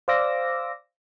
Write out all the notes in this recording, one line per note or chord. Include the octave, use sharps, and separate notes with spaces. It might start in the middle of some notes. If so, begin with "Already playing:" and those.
C5 D5 F5 D6 E6 A#6